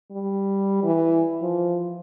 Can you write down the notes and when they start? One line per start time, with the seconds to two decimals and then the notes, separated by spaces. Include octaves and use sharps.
0.12 G3
0.84 E3
1.42 F3